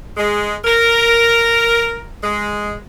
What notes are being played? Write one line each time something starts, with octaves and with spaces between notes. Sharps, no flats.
G#3
A#4
G#3